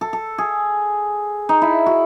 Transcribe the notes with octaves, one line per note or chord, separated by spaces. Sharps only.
A4
A4
G#4
D#4
E4
F#4